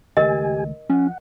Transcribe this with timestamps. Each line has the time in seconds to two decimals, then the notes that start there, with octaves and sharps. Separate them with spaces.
0.17 C#2 D#3 A3 G4 A#4 D#5 G#5
0.90 F3 C#4 F#5